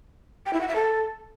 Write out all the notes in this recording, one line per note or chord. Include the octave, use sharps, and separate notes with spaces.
G5
E4
F#5
E5
A4